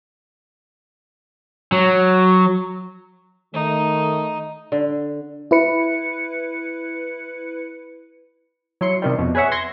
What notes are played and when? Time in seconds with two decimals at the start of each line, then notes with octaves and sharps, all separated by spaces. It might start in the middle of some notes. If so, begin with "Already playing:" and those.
1.72 F#3
3.54 D#3 A3 D#4
4.72 D3
5.51 E4 B4 C#7
8.81 F#3 E4 C6 C#7
9.02 C3 D#3 G3
9.18 F2 B2
9.35 G#4 B4 C#5 E5 F#5
9.51 C6 G#6 A#6 C7 C#7